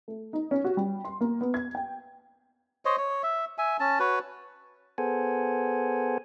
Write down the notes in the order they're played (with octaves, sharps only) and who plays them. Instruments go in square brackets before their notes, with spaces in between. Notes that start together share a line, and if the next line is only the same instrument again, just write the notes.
[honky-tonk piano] A3
D#4
C#4
F#4
G3
C6
A#3
B3
G#6
G5
[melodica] C5 C#5 D#5
C#5
E5
E5 G#5
C#4 A5
F#4 B4 C#5
[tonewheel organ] B3 G#4 A4 C5 F#5 G#5